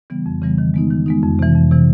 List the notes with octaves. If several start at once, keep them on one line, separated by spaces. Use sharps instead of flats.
C#3 E3 G3 B3
F2
C#3 E3 G3 B3
D#3
G#3 B3 D#4
D#3
G#3 B3 D#4
F2
C3 E3
F2
C3 E3